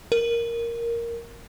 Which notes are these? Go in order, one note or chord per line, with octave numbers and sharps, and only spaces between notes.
A#4